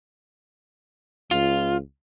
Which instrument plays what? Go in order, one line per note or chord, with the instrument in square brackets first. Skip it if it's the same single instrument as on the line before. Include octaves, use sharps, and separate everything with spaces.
[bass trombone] C#2 [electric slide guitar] F4